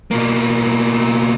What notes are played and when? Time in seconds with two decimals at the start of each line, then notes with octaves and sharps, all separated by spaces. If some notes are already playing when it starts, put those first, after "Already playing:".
0.11 B2 A#3